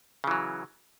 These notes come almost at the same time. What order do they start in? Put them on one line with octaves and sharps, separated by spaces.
C#3 E3 F#3